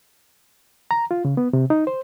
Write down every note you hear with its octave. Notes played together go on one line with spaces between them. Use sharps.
A#5
F4
C#3
B3
C3
D#4
C5